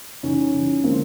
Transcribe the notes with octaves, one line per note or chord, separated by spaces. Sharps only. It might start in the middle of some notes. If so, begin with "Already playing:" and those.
C#3 E3 G3 C#4 D#4
C#3 E3 G3
D3 F3 G#3 A#3 C4